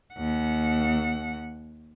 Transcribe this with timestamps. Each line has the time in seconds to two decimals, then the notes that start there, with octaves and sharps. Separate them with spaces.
0.15 D#2 F#5